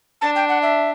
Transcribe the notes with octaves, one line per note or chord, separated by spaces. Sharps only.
D4 A5
G5
F#5
E5